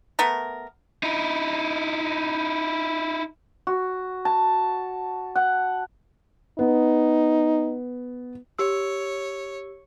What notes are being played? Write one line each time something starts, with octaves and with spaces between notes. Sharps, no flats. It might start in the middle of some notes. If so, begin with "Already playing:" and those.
A3 B3 A#4
D#4 E4
F#4
A5
F#5
B3 D#4
G4 C#5 E6